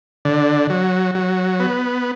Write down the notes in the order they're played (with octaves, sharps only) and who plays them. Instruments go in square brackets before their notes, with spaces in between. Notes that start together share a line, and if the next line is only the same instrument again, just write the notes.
[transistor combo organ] D3
F#3
F#3
B3